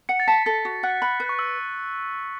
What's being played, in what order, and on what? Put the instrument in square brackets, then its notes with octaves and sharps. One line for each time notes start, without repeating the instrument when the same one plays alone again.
[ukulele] F#5 [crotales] C#7
[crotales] A6
[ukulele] A5 [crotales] B6
[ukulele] A4 [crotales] A6
[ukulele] F#4
[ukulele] F#5 [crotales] F#6
[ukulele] B5 [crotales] F#6
[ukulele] B4
[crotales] C#6
E6